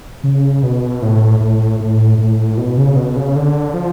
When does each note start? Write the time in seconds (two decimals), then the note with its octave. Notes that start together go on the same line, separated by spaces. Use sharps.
0.24 C#3
0.63 B2
1.02 A2
1.40 A2
1.80 A2
2.18 A2
2.58 B2
2.77 C#3
2.96 B2
3.16 C#3
3.36 D3
3.74 F3